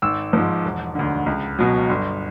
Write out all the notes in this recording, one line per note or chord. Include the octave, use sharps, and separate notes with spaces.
G#1 E6
G#2 F3
E1
D2 D3
C#2
B2 F#3
G1